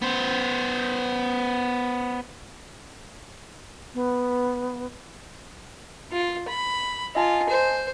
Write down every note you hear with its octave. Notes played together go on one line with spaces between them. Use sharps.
B3 C5
B3
F4
B5
F4 D#5 G#5 A5
C5